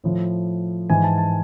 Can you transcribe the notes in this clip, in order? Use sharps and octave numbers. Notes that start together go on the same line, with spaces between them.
A2 F3
G#2 E3 G#5
A5
A5